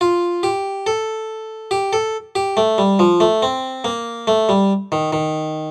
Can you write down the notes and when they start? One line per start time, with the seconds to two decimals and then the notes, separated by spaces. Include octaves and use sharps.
0.01 F4
0.43 G4
0.87 A4
1.71 G4
1.93 A4
2.35 G4
2.57 A3
2.78 G3
2.99 F3
3.20 A3
3.42 C4
3.84 A#3
4.27 A3
4.49 G3
4.92 D#3
5.13 D#3